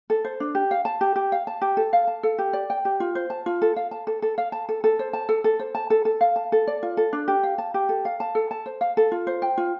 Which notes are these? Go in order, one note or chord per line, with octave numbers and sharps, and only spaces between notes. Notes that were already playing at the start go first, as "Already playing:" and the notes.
A4
C5
D4
G4
F5
A5
G4
G4
F5
A5
G4
A4
F5
A5
A4
G4
D5
G5
G4
F4
C5
A5
F4
A4
F5
A5
A4
A4
F5
A5
A4
A4
C5
A5
A4
A4
C5
A5
A4
A4
F5
A5
A4
D5
F4
A4
D4
G4
F5
A5
G4
A4
F5
A5
A4
A5
C5
F5
A4
F4
C5
G5
F4